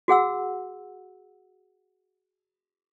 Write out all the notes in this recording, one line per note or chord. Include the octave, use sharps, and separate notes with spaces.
F#4 G#4 F#5 E6